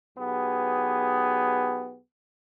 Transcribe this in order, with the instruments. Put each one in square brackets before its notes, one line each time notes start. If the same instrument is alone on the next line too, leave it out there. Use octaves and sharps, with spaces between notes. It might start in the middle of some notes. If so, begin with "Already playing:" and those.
[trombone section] B1 B3 G4 G#4